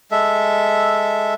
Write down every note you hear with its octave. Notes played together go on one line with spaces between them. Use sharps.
G#3 A4 E5